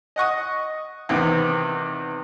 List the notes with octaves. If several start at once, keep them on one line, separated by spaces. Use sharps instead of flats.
D#5 F#5 C#6 D#6
E2 C3 D#3 B3 C4